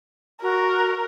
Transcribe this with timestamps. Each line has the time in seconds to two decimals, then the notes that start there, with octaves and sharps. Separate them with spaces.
0.43 F#4 A#4